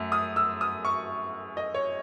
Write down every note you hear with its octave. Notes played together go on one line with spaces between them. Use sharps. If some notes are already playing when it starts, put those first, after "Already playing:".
Already playing: F#2 A3
D#6
E6
D#6
C#6
D#5
C#5